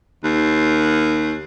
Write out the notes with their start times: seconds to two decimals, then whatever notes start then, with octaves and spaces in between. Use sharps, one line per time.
0.24 D#2